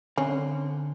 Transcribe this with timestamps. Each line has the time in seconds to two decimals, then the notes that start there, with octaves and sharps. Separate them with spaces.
0.18 D3 C4 C#4